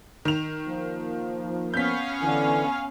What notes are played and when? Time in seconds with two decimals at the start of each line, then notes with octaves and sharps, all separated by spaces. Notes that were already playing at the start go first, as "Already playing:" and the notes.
0.25 D#3 F7
0.66 F3 A#3
1.74 B3 C#4 F5 G6 B6
2.21 D3 E3 G#5